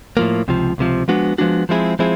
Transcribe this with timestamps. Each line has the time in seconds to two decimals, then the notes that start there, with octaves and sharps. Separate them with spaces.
0.17 A2 F3 A#3
0.48 C#2 C3 F3
0.78 C#2 C3 F3
1.08 F3 G#3 B3 D4 F#4
1.38 F3 G#3 B3 D4 F#4
1.69 F3 G#3 C4 E4 G#4
1.99 F3 G#3 C4 E4 G#4